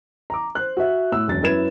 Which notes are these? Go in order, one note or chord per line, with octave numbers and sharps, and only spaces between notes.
A#5 D6
C5 F#6
F#4 E5
A2 E6
E1 F#2 A6
F#2 E4 B4 G#6 E7